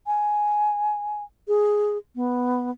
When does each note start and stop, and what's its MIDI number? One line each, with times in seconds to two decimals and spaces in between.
0.07 1.23 80
1.48 1.98 68
2.16 2.70 59